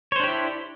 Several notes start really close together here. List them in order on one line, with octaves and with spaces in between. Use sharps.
C#5 C5 D4 G4 E4